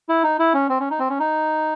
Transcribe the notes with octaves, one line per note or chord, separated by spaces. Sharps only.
E4
D#4
E4
C#4
C4
C#4
D#4
C4
C#4
D#4